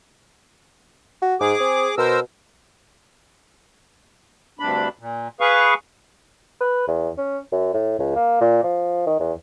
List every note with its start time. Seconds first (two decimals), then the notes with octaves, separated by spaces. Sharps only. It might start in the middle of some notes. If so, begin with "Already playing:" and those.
1.22 F#4
1.41 G#2 G#4 D6
1.61 C4
1.98 B2 A#4 C5 E6
4.60 D2 G2 C3 D4 B5
4.99 A#2
5.40 G#4 B4 F5 C#6
6.60 B4
6.88 E2
7.18 C#4
7.52 F#2
7.74 A2
7.99 C#2
8.15 A#3
8.41 A#2
8.63 F3
9.06 D#3
9.19 E2